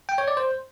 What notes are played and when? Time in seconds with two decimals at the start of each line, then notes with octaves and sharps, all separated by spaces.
0.09 G5
0.18 C#5
0.28 D5
0.37 C5